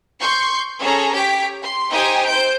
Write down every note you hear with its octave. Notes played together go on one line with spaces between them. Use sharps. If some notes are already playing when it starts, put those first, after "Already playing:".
C6 C#6 G6
C#4 G#4 A4 C#5 A#5
G4 C#5 B6 D7
C6
D#4 G4 C5 G5 G#5 D#6
C5 G6 D7